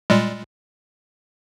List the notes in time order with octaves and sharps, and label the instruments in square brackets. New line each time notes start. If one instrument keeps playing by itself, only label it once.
[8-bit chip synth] A#2 G3 G#3